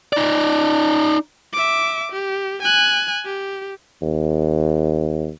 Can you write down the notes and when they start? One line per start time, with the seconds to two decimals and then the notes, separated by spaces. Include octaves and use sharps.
0.13 D#4 D5
1.53 E5 D6
2.12 G4
2.62 G#5 F#6
3.25 G4
4.02 D#2